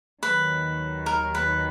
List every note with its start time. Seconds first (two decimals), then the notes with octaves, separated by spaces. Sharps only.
0.23 D#2 D#3 F#3 B4
1.06 A#4
1.35 B4